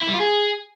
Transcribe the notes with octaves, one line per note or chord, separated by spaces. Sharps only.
E4
G3
F4
G#4